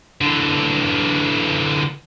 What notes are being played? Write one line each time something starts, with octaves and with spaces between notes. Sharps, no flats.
D3 E3